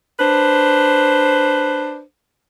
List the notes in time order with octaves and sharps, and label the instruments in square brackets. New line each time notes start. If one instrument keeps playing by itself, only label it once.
[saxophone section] D4 B4 C5